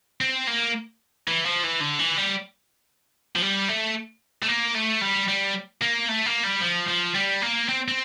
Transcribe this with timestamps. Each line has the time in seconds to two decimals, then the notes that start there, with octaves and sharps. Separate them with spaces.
0.21 C4
0.47 A#3
1.28 E3
1.46 F3
1.64 E3
1.81 D3
1.99 E3
2.17 G3
3.35 F3
3.42 G3
3.68 A3
4.43 A3
4.48 A#3
4.75 A3
5.02 G3
5.28 G3
5.81 A#3
6.08 A3
6.26 A#3
6.44 G3
6.62 F3
6.88 F3
7.15 G3
7.42 A#3
7.69 C4
7.88 C4